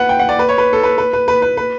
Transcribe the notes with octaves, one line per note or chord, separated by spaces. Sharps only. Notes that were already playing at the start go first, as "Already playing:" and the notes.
Already playing: B4 F#5
G5
F#5
D5
B4
C#5
B4
A4
B4
B4
B4
B4
B4
B4